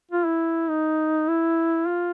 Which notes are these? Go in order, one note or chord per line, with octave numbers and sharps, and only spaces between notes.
F4
E4
D#4
E4
F4